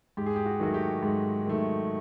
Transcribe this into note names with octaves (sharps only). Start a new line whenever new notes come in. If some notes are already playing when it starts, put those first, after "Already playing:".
G#2 G4
G#4
G4
F#4
D#3 F#3 A3 F#4
G4
G#2
D#3 F#3 A3